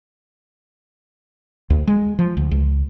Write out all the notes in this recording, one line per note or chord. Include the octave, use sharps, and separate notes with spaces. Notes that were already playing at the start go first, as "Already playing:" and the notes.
D2
G#3
F3
D2
C#2